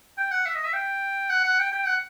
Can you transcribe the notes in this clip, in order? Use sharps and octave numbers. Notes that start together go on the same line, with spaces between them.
G5
F#5
E5
D#5
E5
G5
F#5
F#5
G5
G5
F#5